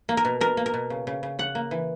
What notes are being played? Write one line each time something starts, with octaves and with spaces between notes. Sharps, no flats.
A#3
A#4
B2
B2 A#4
A#3
A#4
B2
C#3
C#3
C#3
C#3 F#5
A#3
E3